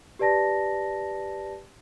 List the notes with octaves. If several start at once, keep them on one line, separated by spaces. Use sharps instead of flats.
G4 B4 D5 A5 A#6